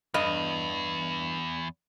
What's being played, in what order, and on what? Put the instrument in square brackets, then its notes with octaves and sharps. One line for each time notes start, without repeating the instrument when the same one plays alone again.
[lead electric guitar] E2 [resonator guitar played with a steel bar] G2 D#5